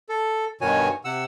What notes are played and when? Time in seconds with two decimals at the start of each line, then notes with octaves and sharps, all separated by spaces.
0.09 A4
0.61 G2 B2 D#3 F#4 C#5 G#5
1.05 C3 F#5 E6